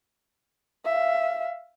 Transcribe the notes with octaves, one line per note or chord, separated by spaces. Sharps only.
E5 F5